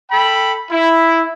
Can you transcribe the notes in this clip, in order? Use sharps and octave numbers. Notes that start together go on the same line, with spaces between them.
A4 G5 B5
E4